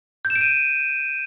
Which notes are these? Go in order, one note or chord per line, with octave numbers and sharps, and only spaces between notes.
G6
E7
D7
D#7